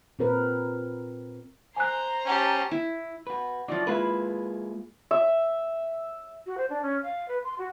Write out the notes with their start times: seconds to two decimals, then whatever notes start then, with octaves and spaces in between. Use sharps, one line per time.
0.19 A#2 C4 A#4 B4
1.77 C5 G#5 A#5 F#6
2.26 C#4 G4 A5
2.71 E4
3.27 F#4 B4
3.68 F3 F#3 D#4 E4 D5
3.87 G#3 A#3 E4 F4 G#4 B4
5.11 E5
6.46 F#4
6.58 C5
6.70 D4
6.82 C#4
7.03 F5
7.28 B4
7.44 C6
7.58 F#4